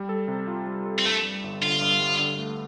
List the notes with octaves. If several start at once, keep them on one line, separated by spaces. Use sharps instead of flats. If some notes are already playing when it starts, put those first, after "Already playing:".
Already playing: G3
A4
C3
F4
G3
A4
C4
G2 A3
G3
G1
D3 F4
G2
G3
D3
A3